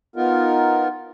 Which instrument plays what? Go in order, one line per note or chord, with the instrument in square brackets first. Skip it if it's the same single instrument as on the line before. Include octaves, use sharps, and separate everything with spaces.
[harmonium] B3 D#4 F4 A#4